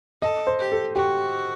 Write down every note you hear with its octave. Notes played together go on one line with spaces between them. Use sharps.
A4 D#5
C5
G4
A4
F#4 G4